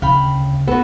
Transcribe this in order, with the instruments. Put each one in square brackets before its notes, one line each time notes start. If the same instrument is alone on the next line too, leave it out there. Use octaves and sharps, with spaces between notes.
[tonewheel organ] D2 [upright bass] C#3 [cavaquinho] F5 G5 B5
[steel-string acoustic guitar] B3 [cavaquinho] F#4 A4